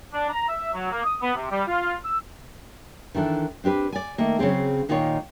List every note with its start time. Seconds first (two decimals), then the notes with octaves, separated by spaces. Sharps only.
0.13 D4
0.29 A#5
0.48 E5
0.73 F#3
0.91 A#3
1.03 D#6
1.21 B3
1.35 C3
1.49 G3
1.67 F4
2.04 E6
3.15 D#3 E3 D4 A4
3.64 C4 D4 G4 B4
3.92 D5 G#5
4.18 D#3 A3 A#3
4.39 C#3 F#3 C4 G#4
4.89 A#2 D#3 D#4 F4 A#4 C#5